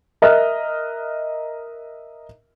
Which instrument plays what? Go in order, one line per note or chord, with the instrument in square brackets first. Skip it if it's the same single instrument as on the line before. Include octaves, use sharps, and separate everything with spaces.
[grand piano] A#4 D#5 E5 F6 F#6